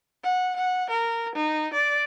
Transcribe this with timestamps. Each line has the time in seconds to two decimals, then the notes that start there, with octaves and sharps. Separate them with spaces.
0.23 F#5
0.56 F#5
0.90 A#4
1.35 D#4
1.73 D5